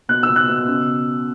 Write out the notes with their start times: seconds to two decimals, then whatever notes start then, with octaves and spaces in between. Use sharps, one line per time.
0.09 B2 F#6
0.23 E6
0.29 B2
0.36 F#6
0.49 B2
0.67 C#3